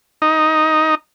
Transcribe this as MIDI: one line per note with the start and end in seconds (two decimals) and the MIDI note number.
0.22 0.95 63